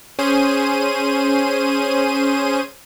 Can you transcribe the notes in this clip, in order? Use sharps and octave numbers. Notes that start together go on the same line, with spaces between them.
C#4 G#4 C5 D#7